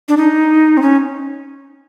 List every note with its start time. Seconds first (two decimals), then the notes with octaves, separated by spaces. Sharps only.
0.09 D4
0.17 D#4
0.77 C4
0.82 C#4